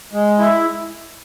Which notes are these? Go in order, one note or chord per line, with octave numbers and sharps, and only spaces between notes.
G#3
E4